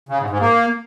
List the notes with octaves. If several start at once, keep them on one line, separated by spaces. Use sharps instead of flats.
C#3
G#2
G#2
A#3